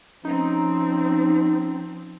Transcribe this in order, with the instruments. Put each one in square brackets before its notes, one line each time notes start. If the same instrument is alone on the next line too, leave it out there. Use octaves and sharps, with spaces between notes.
[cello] F3 C4 [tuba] C#4 [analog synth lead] D#4